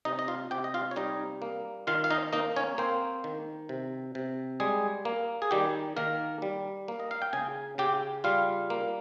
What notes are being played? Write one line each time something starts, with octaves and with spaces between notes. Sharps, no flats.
C3 D#4 D#5
D#5
F4 F5
C3 G4 G5
D#5
F4 F5
C#5
G3 D#4 D#5
A#3
D#3 F4 F5
F5
D#4 D#5
A#3 D#4 D#5
C#4 C#5
A#3 C4 C5
D#3
C3
C3
G3 G#3 G#4
A#3
G#4
D#3 G3 G4
D#3 A#3 A#4
G3
A#3
D#5
F5
G5
C#3 G#4 G#5
C#3 G4 G5
G3 F4 F5
A#3